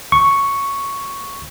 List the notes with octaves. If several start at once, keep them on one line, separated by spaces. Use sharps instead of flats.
C#6